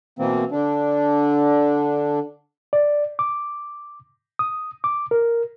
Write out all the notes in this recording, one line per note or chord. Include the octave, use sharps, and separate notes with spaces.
B2 E3 A#3 C4
D3 D4
D5
D6
D#6
D6
A#4